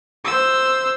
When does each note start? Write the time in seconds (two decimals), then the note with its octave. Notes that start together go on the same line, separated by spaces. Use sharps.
0.25 C5 E6